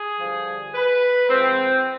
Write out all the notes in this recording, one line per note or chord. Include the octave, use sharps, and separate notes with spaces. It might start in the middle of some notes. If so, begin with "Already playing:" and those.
Already playing: G#4
G2 D3 F3
B4
G#2 F3 C4